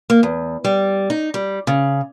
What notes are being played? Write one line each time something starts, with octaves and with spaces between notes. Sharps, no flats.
A#3
E2
G3
D#4
G3
C#3